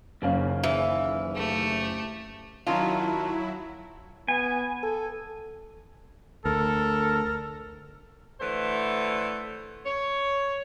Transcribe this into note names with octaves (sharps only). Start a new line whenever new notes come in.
F#1 D#2 C#3 A#3 C#4 F5
E3
A3 G4
D#3 F#3 C#4 E4 F4 A5 A#5
B3 G#5
A4
D2 A4 A#4
D3 E3 A3 B4 C5
C#5